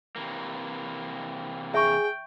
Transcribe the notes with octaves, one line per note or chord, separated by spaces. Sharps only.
C3 E3 A#3
G#4 E5 G5 C#6